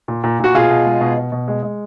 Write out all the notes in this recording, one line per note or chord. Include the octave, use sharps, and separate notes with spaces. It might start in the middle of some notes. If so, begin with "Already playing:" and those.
A#2
A#2
A#2 F#4
B2 F4 G#4
B2
G#3
B2
B2
B2
G#3
G#3